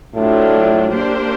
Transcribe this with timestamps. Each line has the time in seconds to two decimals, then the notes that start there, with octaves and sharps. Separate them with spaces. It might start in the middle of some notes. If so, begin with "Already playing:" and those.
0.14 A2 F#3 A3 D4 F4
0.91 A#3 D4 G4 C5